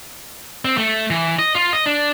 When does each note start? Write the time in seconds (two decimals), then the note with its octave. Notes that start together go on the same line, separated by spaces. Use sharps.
0.65 C4
0.78 A3
1.10 E3
1.39 D#5
1.55 F4
1.73 D#5
1.86 D4